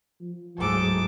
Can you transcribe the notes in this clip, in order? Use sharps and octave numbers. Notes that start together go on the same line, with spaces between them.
F3
D1 G#2 F#3 G#4 A4 D6